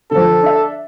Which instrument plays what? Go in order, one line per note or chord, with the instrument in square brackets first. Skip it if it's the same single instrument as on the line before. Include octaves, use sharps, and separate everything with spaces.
[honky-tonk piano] D3 F3 [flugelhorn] A4
[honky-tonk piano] D4 E5